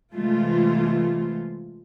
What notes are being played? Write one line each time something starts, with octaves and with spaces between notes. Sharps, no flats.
C3 E3 G#3 A3 F4